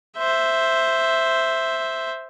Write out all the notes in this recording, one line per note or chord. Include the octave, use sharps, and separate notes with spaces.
C5 E5